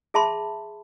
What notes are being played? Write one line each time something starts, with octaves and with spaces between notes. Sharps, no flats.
G#4 E5 A5 B5 C6